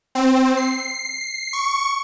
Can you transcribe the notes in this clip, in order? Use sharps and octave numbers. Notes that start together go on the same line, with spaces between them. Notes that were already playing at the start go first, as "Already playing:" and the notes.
C4
C7
C#6